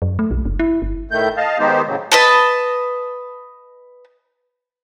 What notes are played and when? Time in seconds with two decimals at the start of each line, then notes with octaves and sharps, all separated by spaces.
0.02 F#2
0.19 A3
0.31 B1
0.45 F#1
0.59 E4
0.82 G1
1.11 A2 D#3 A3 G6
1.37 D#5 F5 A5
1.58 D#3 G#3 B3 D#4 G4 C5
1.86 A2 C#3 F#3
2.12 B4 D#5 A5